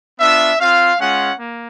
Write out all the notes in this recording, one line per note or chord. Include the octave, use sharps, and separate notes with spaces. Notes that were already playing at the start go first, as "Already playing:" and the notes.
B3 D4 F4 E5
C4 F4 F5
G#3 C#4 F4 F#5
A#3